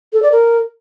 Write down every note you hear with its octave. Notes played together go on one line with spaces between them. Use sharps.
A4
D5
A#4